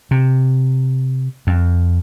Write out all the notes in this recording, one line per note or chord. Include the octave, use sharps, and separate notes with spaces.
C3
F2